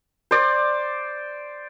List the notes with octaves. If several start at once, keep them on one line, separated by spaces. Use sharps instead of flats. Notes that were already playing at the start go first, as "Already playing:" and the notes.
C5 D5